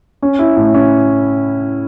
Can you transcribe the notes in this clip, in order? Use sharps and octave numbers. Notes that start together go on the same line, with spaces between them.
C#4
E4
A2
C#4